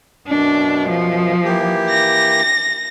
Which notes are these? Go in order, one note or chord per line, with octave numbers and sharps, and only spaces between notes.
F#2 B2 D4
F3
E3 A#3 G4
A#6